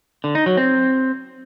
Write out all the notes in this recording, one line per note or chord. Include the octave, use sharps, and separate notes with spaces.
D3
D#4
F#3
C4